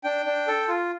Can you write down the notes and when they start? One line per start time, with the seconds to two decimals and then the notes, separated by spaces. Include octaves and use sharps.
0.04 D4 G5
0.26 D4
0.47 A4
0.68 F4